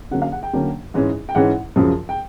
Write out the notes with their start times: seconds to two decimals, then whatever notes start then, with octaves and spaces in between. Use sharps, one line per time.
0.11 D3 F#3 A#3 C#4 F#5
0.22 F5
0.32 F#5
0.43 G5
0.53 D3 F#3 A#3 C#4
0.94 G#2 E3 G#3 C#4
1.29 G5
1.35 G#2 E3 G#3 C#4 F#5
1.76 F#2 C#3 F3
2.09 G5